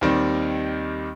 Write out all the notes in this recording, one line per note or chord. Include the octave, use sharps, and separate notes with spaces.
D#2 D#3 G3 C4